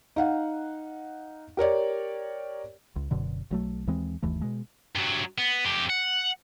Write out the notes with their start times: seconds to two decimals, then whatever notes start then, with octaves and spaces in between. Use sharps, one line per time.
0.16 D#4 F5 F#5
1.57 G4 A#4 C#5 D5
2.96 C#2
3.11 F#1 F#2 B2 D3
3.51 B1 F#3 A3
3.87 D#2 E3 G#3 C4
4.23 G1 D#2 E3 A3
4.41 B2 G#3
4.96 G2 F#3
5.38 B3
5.65 F2 G4
5.90 F#5